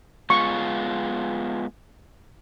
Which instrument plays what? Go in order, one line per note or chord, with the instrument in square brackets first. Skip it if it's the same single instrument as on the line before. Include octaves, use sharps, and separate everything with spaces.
[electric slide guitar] G#3 B3 F4 [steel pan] C#6